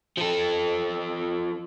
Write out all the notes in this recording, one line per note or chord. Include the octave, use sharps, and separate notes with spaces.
F3 A4